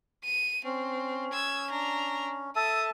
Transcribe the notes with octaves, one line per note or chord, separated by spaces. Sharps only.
D#7
C4 C#4
E6 G#6
D4 A#5
A4 E5 A5 D#6